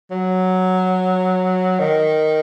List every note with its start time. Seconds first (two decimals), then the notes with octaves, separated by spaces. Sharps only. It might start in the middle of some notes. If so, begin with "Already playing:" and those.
0.11 F#3
1.79 D#3